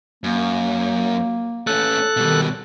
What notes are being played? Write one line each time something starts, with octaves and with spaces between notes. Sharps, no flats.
F#2 A#3
A3 C#4 A4 F#6
B2 D#3 G3